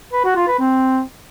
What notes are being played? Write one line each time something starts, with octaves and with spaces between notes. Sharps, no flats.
B4
F#4
F4
B4
C4